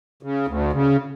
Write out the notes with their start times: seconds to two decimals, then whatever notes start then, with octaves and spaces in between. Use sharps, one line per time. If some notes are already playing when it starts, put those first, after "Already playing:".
0.23 C#3
0.48 D2
0.73 C#3